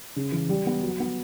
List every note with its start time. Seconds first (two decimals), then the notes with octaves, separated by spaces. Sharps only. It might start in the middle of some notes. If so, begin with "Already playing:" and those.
0.16 C#3
0.32 E3
0.49 G3
0.67 B3
0.82 F#3
1.00 B3